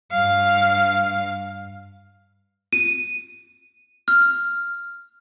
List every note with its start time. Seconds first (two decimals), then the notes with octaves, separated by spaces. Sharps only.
0.11 G2 F5
2.73 D#7
4.08 F6